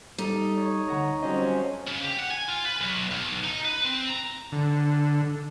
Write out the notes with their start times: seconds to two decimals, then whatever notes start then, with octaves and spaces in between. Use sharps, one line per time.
0.18 G3 D#4 A4
0.56 C#5
0.88 D2 F#5 A#5
1.23 F2 F#3 G3 C#4 C5 D#5
1.87 C#3
2.04 G4
2.18 F#5
2.31 G#5
2.48 F4
2.65 B4
2.81 B1
3.11 B1
3.44 D#4
3.65 B4
3.85 C4
4.10 A#5
4.52 D3